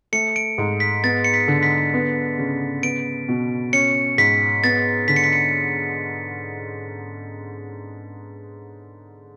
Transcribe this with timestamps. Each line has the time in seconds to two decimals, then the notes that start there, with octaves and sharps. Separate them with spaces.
0.13 A3 C#7
0.36 D7
0.58 G#2
0.80 B6
1.04 B3 A6
1.24 C#7
1.34 B6
1.48 D3
1.63 B6
1.94 B3
2.39 C#3
2.83 B3 D7
3.29 B2
3.73 C#4 C#7
4.18 G#2 B6
4.64 B3 A6
5.08 D3 B6
5.16 C#7
5.24 B6
5.33 C#7